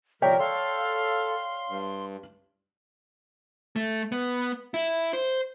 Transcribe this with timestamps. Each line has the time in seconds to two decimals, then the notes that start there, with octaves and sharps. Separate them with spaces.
0.22 C3 F3 A#4 C#5 D5 G5 B6
0.39 A4 F5 C6
1.69 G2
3.76 A3
4.12 B3
4.74 E4
5.13 C5